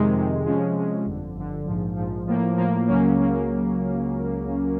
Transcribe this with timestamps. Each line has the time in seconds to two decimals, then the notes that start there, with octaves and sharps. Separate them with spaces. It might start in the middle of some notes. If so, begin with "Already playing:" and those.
Already playing: F2 C3 D#3 G#3
0.14 F2 C3 D#3 G#3
0.43 C3 F3 G#3 C#4
0.75 C3 F3 G#3 C#4
1.05 G1 F2 D3
1.35 G1 F2 D3
1.65 A#1 G#2 F3
1.96 A#1 G#2 F3
2.26 A2 F3 A#3
2.57 A2 F3 A#3
2.87 C#2 C#3 F#3 A#3 C#4
3.18 C#3 F#3 A#3 C#4